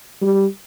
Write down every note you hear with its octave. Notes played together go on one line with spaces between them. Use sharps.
G3